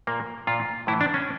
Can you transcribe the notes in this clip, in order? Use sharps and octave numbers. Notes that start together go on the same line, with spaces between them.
A#2 A#3
A#2 F4
A2 E3 E4
D4
C#4